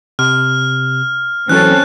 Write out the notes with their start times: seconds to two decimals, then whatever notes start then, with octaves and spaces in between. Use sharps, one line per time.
0.19 C3 F6
1.49 E3 F#3 C4 C#4 A4 F#6